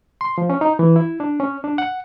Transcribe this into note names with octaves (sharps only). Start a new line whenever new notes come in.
C6
F3
C#4
D#4
E3
E4
D4
C#4
D4
F#5